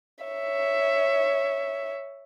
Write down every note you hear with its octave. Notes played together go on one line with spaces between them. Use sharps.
C#5 E5